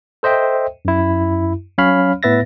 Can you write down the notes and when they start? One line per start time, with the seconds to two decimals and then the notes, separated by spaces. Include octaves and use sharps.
0.23 A4 C5 D#5 E5 G5
0.85 F#2 E4
1.78 F#3 C#4 C#5 F5 B5 F6
2.23 A2 B3 B4 E5 A6 A#6